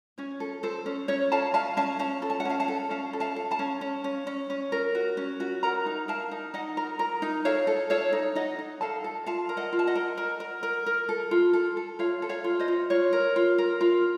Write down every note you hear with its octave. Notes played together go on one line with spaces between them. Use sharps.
C#4 C#5
A4
A4 C5
C#4
C#4 C#5
A4 F5 A5
C#4 F5 A5
C#4 F5 A5
C#4 F5 A5
A4
A5
F#5
C#4 F5 A5
F5 A5
A4
C#4 F5 A5
A4
F5 A5
A4
F5 A5
C#4
C#4
C#4
C#4
C#4
A#4
F#4
C#4
F#4
A#4 F#5 A#5
D#4
A#4 F5 A5
D#4
D#4 D#5 F#5
A#4
A#4
D#4
A4 C#5 F5
A4
A4 C#5 F5
D#4
D#4 D#5 F#5
D#4
A4 F5 A5
A4
F4 F5 A5
A#4
D#5 F#5
F4
A5
D#5 F#5
A#4
A#4
A#4
A#4
A#4
A4
F4
A4
A4
F4 C#5 F5
A4
C#5 F5
F4
C5 D#5
F4
F4 C#5
A#4
F4
A#4
F4